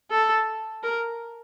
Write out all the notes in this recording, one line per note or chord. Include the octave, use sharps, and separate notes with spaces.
A4
A#4